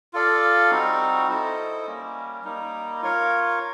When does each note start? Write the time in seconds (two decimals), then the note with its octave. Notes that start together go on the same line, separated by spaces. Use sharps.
0.13 F4 A4 D5 F5
0.70 G3 C4 D#4 F#4
1.29 E4 A4 C5 D#5
1.86 G3 A#3 C#4
2.44 G3 A#3 D#4
3.01 F4 A#4 C#5 F5